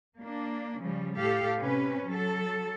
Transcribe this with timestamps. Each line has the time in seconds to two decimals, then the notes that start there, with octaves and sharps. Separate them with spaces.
0.21 A#3 D4
0.81 C#3 F3 G3
1.18 A2 G4 A4 F5
1.60 C3 C#4 B4
2.07 F#3 A4